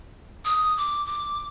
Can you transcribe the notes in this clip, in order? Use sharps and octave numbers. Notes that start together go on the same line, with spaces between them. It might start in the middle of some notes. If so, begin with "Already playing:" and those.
D#6
D6
D6